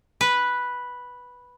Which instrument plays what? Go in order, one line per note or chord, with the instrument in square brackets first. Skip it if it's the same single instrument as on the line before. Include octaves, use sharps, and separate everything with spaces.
[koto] B4